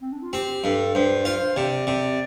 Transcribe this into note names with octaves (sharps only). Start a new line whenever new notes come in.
C4
D4
F4
C4 G4
G2 A4
G2 C5
F4 C5
C3 D5
C3